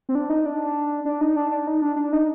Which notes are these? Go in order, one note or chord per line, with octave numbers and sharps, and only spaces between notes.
C4
D4
D#4
D4
D4
D#4
D4
D4
D#4
D4
D4
D#4